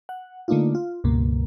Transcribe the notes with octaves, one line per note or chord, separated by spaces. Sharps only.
F#5
D3 A3 A#3 D4 D#4 F4
F4
C#2 G2 B2 A#3